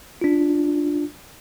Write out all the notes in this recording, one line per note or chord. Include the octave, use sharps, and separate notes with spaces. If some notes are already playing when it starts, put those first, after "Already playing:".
D4 F4